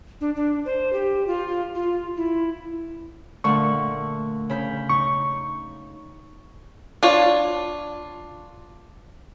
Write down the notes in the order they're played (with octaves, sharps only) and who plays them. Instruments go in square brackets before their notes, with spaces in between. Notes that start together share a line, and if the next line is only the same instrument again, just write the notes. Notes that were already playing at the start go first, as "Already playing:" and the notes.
[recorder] D4
D4
C5
G4
F4
F4
E4
[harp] A#2 D3 A3 [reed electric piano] C#6
[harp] C#3 B5 G6
[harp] D#4 [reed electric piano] C#6
[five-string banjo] D4 F4 C#5